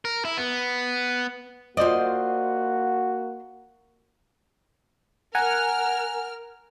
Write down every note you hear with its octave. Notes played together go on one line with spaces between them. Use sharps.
A#4
E4
B3
A#3 F4 F#4 C5 D5 D#5
A#4 F#5 G#5 A#5 F6